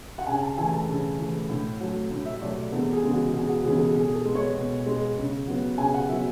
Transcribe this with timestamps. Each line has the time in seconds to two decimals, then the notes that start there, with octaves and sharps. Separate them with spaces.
0.18 F#5
0.27 C#3 G#5
0.42 A5
0.58 E3 A3 G#5
0.73 A5
0.88 C#3
1.19 E3 A3
1.49 A2
1.80 F#3 A3
2.11 A2
2.26 E5
2.41 F#3 A3 D5
2.72 E2 A4
2.92 G#4
3.03 C#3 E3 G#3 B3
3.13 F#4
3.33 E2 G#4
3.49 F#4
3.64 C#3 E3 G#3 B3 G#4
3.79 A4
3.95 B2 G#4
4.15 A4
4.25 G#3 B3
4.35 C#5
4.56 B2
4.86 G#3 B3
5.17 C#3
5.47 F#3 B3
5.78 C#3 G#5
5.94 F#5
6.09 F#3 B3 E5